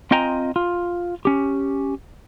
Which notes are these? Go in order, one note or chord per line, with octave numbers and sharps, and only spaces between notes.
C4 F4 D#5 G5 G#5 A#5
F4
C#4 G4